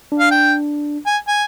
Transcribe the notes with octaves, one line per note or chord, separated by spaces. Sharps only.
D4
F5
G5
G#5
G#5